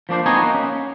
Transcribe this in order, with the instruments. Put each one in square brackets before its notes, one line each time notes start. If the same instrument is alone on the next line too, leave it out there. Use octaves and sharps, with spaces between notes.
[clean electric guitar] F3 A#3 D4 C5
B3 C4 D#4 F#4 G#5
A#3
C#4